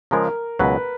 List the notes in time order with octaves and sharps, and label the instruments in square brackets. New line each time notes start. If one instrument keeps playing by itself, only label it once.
[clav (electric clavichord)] C#3 F3 G#3 [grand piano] A#4
[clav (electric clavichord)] C#2 B2 F#3 [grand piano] B4